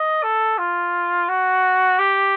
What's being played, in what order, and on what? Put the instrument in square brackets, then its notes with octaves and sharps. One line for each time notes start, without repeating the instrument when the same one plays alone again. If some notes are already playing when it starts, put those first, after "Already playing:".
Already playing: [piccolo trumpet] D#5
A4
F4
F#4
G4